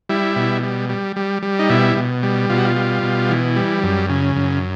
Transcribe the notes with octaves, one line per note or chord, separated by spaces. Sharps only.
G3 E4
B2
G3
G3
G3
G3
D#4
B2 E4
B2
G3
B2 F4
F#4
F4
G3
B2
E3
G3
F#2
C#3
F#2